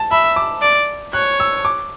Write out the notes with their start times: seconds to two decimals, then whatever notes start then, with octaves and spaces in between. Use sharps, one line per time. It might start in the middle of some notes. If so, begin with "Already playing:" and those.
Already playing: A5
0.11 E5 B5
0.36 D6
0.62 D5
1.13 C#5 F#6
1.40 E6
1.65 D6